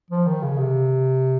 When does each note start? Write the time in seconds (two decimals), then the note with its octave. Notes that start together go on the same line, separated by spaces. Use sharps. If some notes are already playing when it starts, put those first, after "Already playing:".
0.10 F3
0.27 D#3
0.43 C#3
0.58 C3